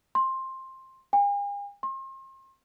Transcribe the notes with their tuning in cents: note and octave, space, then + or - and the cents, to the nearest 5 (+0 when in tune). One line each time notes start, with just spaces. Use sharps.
C6 +15
G#5 -45
C6 +40